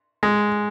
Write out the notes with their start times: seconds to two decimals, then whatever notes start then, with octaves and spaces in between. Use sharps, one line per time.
0.23 G#3